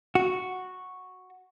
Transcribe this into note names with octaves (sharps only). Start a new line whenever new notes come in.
F#4